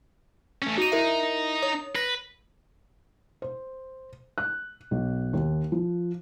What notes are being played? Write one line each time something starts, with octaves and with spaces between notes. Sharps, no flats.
A3 C#4
D#4 F#4 D#7
E4 A#4 E5
C#5 D#6
B4 A#6
C5
F#6
B1
D#2
F3